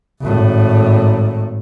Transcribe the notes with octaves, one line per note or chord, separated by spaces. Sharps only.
G#1 A2